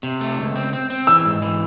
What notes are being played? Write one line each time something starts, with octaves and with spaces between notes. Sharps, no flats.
C3
A3
C#2
C4
C4
C4
E3 E6
G#2
E3